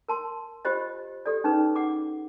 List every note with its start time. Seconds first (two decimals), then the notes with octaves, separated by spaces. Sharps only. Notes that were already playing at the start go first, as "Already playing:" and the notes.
0.09 A#4 A5 C6
0.65 F4 G4 C5 D#5
1.26 G4 A4 D5
1.44 C#4 D#4 G#4 B4
1.76 F#5 D6